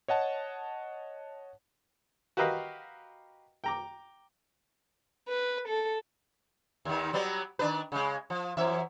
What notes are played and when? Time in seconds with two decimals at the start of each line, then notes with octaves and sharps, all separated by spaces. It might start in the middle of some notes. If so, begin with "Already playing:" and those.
0.08 C#5 D#5 F#5 A5
2.37 F#4 G4 A#4 B4 D#5 F5
3.64 G5 A#5 D6
5.26 B4
5.67 A4
6.85 D#2 D#3
7.13 F#3 G3 B3
7.59 D#3 D4 B4
7.92 C#3 G#3
8.30 F3
8.57 F#2 E3 E5